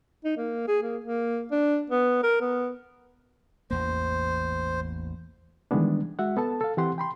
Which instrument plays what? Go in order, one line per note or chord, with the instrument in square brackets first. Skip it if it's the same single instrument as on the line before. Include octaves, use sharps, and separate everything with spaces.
[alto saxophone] D#4
A#3
G#4
A#3
A#3
D4
B3
A#4
B3
[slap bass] A1 E2 A#3 [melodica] C5
[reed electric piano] D#3 E3 G3 G#3 B3 D4
G#3 F#4 E5 F#5
B3 A4 A5
A4 F5
E3 C4 G4 F#5 C6
G5 B5 C6